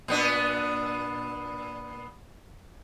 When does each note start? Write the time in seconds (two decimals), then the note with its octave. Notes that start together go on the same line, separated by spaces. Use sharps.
0.08 A#2 B3 D4